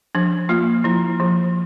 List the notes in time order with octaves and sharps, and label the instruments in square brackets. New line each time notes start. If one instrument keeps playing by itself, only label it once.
[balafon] F3 D4
A#3 F4
F3 E4
F3